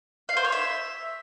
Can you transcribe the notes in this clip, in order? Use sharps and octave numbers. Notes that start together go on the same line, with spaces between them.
F5
C5
C#5
E5